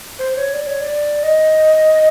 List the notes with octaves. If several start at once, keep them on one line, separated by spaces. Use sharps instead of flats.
C5
C#5
D5
C#5
D5
D#5